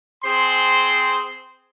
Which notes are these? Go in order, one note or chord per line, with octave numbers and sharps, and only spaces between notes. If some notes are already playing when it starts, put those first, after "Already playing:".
C4 G#4 C5 C6